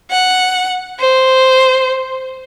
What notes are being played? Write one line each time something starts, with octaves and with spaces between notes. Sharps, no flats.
F#5
C5